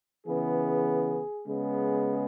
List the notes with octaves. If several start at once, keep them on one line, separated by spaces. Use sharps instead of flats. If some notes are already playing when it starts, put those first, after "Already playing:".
C#3 E3 B3 G#4
C#3 G#3 B3